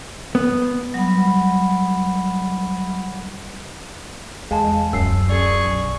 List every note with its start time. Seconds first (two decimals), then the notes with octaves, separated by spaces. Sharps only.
0.35 B3
0.94 F#3 G3 F#5 B5
4.51 E2 G#3 F5 G#5 A5
4.93 D1 F#2 E6 C7
5.29 G#4 D5 C#6
5.67 B1